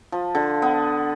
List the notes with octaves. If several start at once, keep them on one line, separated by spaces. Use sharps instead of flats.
F3
D3
B3